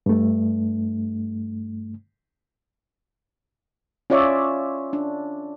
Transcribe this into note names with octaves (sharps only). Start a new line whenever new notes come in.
G2 A3
C#4 F4 C#5 D5 E5
D4